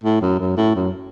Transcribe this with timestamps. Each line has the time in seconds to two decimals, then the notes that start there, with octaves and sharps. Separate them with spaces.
0.04 A2
0.21 F#2
0.39 F#2
0.57 A2
0.75 F#2